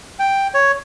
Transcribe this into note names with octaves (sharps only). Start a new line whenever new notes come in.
G5
C#5